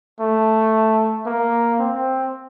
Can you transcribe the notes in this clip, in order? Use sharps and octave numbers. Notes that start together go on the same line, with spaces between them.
A3
A#3
C4